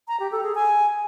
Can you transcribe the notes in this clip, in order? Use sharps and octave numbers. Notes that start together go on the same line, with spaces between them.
A#5
G4
A4
G#4
G#5